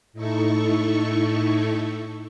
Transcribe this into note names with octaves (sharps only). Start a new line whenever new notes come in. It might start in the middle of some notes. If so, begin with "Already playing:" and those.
A2 D#4 E4 A4 C#6